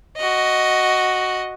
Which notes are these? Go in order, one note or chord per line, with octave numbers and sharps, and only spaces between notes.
F#4 D#5